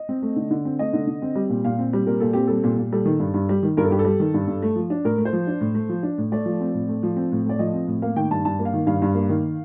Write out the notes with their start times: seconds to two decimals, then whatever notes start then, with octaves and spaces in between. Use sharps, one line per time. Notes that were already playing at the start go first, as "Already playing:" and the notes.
Already playing: D#5
0.09 C4
0.22 A3
0.36 D3
0.51 D3
0.65 C4
0.79 A3 D#5
0.93 D3
1.07 D3
1.22 C4
1.35 G3
1.49 A#2
1.65 A#2 F5
1.79 C4
1.93 G3
2.07 A#2 A#4
2.20 A#2 A4
2.33 C4 G4
2.47 G3 A4
2.64 A#2
2.78 A#2
2.92 G3 A4
3.06 D#3
3.20 G2
3.34 G2
3.49 G3
3.63 D#3
3.77 G2 A#4
3.84 A4
3.90 G2 G4
3.99 A4
4.05 G3
4.20 D#3
4.34 G2
4.47 G2
4.62 A3
4.76 F3
4.90 D4
5.05 A2 A#4
5.18 A3
5.25 C5
5.33 F3
5.47 D4
5.61 A2
5.75 A3
5.89 F3
6.03 D4
6.18 A2
6.32 A3 D5
6.46 F3
6.60 C4
6.74 A2
6.89 A3
7.03 F3
7.16 C4
7.32 A2
7.46 A3 D5
7.59 F3 D#5
7.74 C4
7.87 A2
8.02 A#3 F5
8.16 D#3 G5
8.31 G2 A5
8.45 G2 A5
8.59 A#3
8.65 F5
8.74 D#3
8.87 G2 F5
9.02 G2
9.15 A#3
9.29 D#3